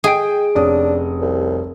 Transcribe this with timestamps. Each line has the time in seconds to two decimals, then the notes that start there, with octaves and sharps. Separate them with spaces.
0.04 G#4 D#5 G5 D7
0.55 F1 C#4 D4 D#6
1.21 C2